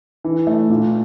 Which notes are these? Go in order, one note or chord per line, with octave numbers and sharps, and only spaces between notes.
E3
A3
A#2